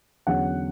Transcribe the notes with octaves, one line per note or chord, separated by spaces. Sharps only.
E2 D3 F#3 C#4 F#5